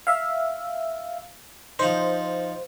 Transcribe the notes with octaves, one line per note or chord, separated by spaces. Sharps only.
E5 F5
F3 D#4 C5